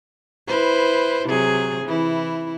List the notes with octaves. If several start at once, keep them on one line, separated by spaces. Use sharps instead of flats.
E4 B4 C5
C3 F#3 G#4
E3 E4